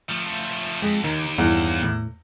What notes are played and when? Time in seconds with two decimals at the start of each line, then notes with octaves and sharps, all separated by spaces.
0.09 F3 A3
0.82 F2 G#3
1.04 D#2 D#3
1.38 E2 G2
1.83 A2